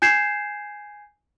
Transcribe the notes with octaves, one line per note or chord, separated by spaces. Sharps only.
G#5 G6 G#6 C7 E7